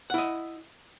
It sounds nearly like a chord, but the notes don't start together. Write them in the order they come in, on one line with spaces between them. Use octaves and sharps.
F#5 E4 D#5